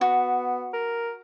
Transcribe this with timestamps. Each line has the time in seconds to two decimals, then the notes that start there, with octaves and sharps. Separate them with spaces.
0.01 B3 F#4
0.73 A#4